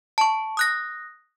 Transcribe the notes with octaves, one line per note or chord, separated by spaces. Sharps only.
A5 C#6
D#6 F#6 A#6